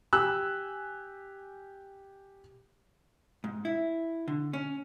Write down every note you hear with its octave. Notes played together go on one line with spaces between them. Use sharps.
G4 G#5 E6 F#6
G#2
E4
D3
C#4